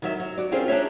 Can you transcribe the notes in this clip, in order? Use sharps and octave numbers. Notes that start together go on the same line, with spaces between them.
D#3 F#3 E5
F#3
F#4 D5
C4 C#4 F4 G#4 A#4 C5
D4 D#4 C#5 E5